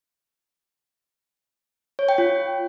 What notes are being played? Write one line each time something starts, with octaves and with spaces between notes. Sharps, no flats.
C#5
G5
F4